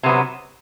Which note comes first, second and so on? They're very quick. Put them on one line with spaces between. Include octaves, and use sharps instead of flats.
C3 B3 F#3